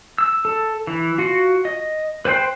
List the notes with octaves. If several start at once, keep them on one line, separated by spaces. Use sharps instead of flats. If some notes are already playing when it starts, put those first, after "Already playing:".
E6
A4
E3
F4 F#4
D#5
B4 C5 G5 C6